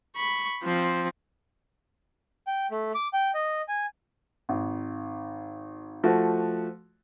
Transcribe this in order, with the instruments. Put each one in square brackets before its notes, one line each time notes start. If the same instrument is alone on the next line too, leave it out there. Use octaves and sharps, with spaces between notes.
[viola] B5 C#6
F3 C4
[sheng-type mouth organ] G5
A3
D6
G5
D#5
G#5
[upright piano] G#1
F3 A3 F#4